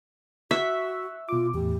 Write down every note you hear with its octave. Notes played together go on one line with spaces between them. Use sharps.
F#4 E5 C#6 E6 F#6
B2 F4 D6
E2 A2 G4